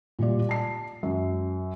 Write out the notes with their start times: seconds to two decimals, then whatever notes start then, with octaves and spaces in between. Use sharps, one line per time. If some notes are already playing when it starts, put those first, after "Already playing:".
0.19 A#2 G3 F4 D5
0.49 A5 C7
1.03 F#2